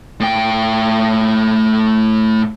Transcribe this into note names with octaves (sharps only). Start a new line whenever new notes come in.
A2 G5